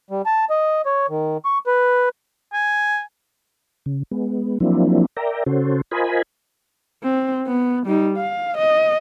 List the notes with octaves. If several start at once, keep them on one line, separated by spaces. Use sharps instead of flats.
G3
A5
D#5
C#5
D#3
C#6
B4
G#5
C#3
G#3 B3
F3 F#3 A#3 C4 D4 E4
A#4 D5 E5 G5 A#5
C#3 C#4 F#4 A4 C5
F4 A#4 C5 D#5 G#5 B5
C4
B3
G3 D#4
F5
D#5